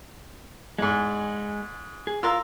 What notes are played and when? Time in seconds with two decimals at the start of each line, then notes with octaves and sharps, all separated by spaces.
0.79 E2 G#2 G#3
2.07 G#4
2.23 F4 A#4 F5 A#5 C6 E6